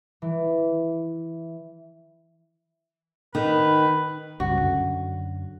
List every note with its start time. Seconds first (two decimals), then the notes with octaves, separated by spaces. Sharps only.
0.22 E3
3.35 D#3 B4
4.40 C#2 G2 C#3 F#4
4.60 F#2 D3 C#4